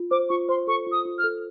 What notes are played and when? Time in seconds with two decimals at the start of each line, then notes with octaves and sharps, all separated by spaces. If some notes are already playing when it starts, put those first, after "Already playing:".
Already playing: F4
0.11 C5 D6
0.29 F4 C#6
0.49 C5 C6
0.67 A4 C#6
0.87 F4
0.92 D#6
1.05 F4
1.18 F6
1.24 A4